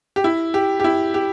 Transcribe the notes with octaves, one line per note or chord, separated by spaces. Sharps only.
G4
E4
G4
G4
E4
G4